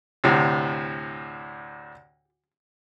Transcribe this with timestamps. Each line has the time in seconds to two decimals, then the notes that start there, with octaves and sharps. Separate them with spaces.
0.24 D2 A2 C3